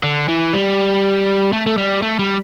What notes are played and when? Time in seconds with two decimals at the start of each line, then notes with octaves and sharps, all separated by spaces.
0.03 D3
0.29 E3
0.54 G3
1.53 A3
1.66 A3
1.78 G3
2.02 A3
2.19 G3